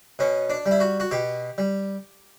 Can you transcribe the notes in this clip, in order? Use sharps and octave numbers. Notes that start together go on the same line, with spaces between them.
B2 C#4
D4
G3
E4
F#4
F#4
B2 G4
G3